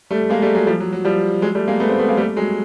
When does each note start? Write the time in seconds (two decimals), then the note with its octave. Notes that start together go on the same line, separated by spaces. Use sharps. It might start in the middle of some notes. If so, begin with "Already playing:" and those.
0.11 G3 A3
0.30 G#3 A#3
0.42 G3 A3
0.55 F#3 G#3
0.67 F3 G3
0.80 F#3
0.92 F#3
1.05 F3 G3
1.42 F#3 G#3
1.55 G3 A3
1.68 G#3 A#3
1.80 A3 B3
1.89 A#3 C4
1.99 A3 B3
2.09 G#3 A#3
2.17 G3 A3
2.36 F#3 G#3